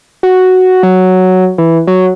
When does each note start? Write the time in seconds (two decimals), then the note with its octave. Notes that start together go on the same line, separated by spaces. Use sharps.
0.23 F#4
0.83 F#3
1.58 E3
1.87 F#3